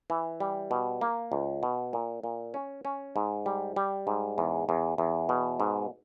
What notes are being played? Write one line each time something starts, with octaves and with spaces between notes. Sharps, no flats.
E3
G3
B2
A#3
C#2
B2
A#2
A#2
C#4
C#4
G#2
G3
G3
G#2
E2
E2
E2
B2
G#2